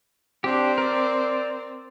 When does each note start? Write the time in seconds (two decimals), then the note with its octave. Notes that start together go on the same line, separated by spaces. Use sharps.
0.44 C4 D4 G4
0.78 A#4 D5